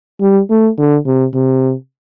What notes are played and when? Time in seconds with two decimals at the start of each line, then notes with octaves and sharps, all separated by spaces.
0.21 G3
0.50 A3
0.78 D3
1.06 C3
1.34 C3